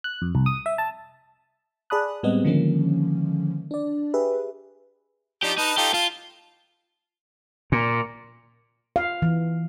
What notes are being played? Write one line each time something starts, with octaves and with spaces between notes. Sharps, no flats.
F#6
F2
C2
D#6
E5
A5
G#4 D5 A5 B5 D#6 F#6
A2 G3 G#3 B3 C4 D#5
D3 D#3 F3 G#3 A#3 C#4
D4 D5
G4 G#4 B4 E5
F3 D4 D#4 G4
D#4 B4 D#5 A5
D#4 F4 G4 A4
F4 F5 A5
A#2
F5
E3